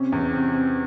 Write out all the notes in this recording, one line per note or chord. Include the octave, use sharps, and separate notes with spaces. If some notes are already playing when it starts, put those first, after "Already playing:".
Already playing: C3 C#4
E2
C3
C3